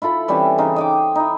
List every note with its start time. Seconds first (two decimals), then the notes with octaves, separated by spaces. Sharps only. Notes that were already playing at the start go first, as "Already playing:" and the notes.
0.02 E4 F4 A4 B5
0.28 E3 G3 C4 C#4
0.58 C#3 D#4 C5
0.76 D#5 G5 D6
1.15 D#4 E4